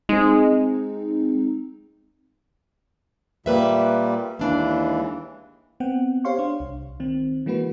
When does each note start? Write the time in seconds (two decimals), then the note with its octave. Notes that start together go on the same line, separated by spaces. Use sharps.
0.09 G#3 C4 D#4
3.46 A#2 G3 A#3 B4 E5
4.39 D#2 E3 G#3 D4
5.80 B3 C4 F#5 G5
6.25 G4 C5 C#5 F5 C6 C#6
6.37 D4 F5
6.60 C2
7.00 D#3 C4
7.46 E3 G#3 A#3 F#4 B4